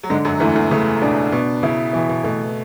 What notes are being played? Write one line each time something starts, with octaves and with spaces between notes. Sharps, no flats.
F#3
G#2 D3 G#3
F#2 F#3
E2 E3 A3
E2 E3
C#3 A3
B2 D4
B2 B3
C#3 E4
B2 E3
B2
B2 A3